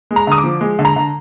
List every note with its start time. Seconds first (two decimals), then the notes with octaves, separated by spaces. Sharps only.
0.11 G#3
0.16 A#5
0.27 D3 D#6
0.38 D6
0.44 F3
0.61 G#3
0.79 D3
0.85 A#5
0.96 D3